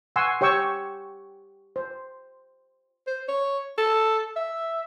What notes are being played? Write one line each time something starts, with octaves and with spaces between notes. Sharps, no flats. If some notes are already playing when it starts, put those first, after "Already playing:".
F#5 G#5 C6 C#6 E6
G4 C#5 G5 C#6 E6
C5
C5
C#5
A4
E5